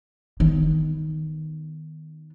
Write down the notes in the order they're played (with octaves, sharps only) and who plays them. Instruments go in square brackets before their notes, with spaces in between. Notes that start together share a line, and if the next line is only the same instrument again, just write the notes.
[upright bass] D#3 B3